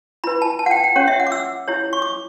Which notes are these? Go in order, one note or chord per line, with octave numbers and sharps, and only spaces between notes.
E4 B4 B5
A5
A5
F#5
G5
G5
C#4 G4 C#5 F#5
E5
F#5
D6
E6
E4 G4 C#5
C#6
D6